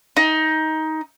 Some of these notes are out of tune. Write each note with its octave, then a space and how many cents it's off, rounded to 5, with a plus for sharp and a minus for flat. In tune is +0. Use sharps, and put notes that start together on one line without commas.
D#4 +15